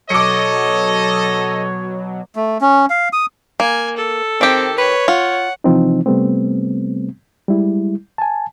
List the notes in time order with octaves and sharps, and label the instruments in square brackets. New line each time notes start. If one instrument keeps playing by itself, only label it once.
[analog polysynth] B2 F#3 [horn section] A4 D#5 [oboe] C#5 [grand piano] D6 C#7
[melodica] A3
C#4
F5
D#6
[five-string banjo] A#3 [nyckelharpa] G#5
[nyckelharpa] A4
[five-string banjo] D#3 G4 [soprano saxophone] C4
[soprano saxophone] B4 [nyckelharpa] C#5
[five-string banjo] F4 [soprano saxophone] F#5
[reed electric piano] C3 E3 F3 C4 D#4
C3 G3 A3 B3 C4
G3 G#3 E4
G#5 A5